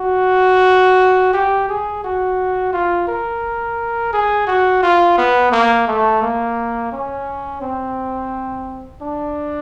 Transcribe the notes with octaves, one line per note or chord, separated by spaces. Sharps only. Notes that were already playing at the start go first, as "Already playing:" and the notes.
Already playing: F#4
G4
G#4
F#4
F4
A#4
G#4
F#4
F4
B3
A#3
A3
A#3
C#4
C4
D4